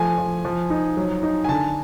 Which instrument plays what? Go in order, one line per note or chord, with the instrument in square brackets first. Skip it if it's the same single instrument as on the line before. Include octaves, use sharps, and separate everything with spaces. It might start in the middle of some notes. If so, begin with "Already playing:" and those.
Already playing: [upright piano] F3 A3 [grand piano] G#5
[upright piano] F3
F3
D#4
F#3
D#4
[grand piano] G#5
[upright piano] D3 [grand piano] A5